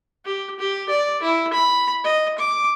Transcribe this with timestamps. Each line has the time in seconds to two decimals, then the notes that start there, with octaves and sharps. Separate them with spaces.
0.25 G4
0.59 G4
0.89 D5
1.22 E4
1.54 B5
2.04 D#5
2.38 D6